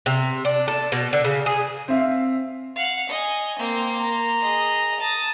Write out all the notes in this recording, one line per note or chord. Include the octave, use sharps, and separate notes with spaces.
C3
D4
A4
B2
D3
C#3
G#4
C4 E5 F5
F5 F#5
D#5 G#5
A#3 C4 C6
A#5
G#4 D#5
A5 D#6